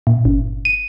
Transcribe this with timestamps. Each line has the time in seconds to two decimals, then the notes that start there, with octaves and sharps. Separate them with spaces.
0.07 A#2
0.25 G1
0.65 D#7